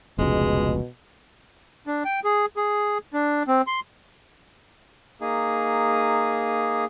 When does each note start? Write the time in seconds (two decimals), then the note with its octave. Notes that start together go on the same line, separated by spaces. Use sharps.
0.19 F1 C#2 B2 G#3
1.87 D4
2.05 G5
2.24 G#4
2.57 G#4
3.13 D4
3.48 C4
3.67 C6
5.21 A#3 D#4 G#4